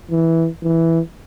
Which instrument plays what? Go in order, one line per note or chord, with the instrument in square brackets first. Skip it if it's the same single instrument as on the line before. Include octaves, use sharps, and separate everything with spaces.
[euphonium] E3
E3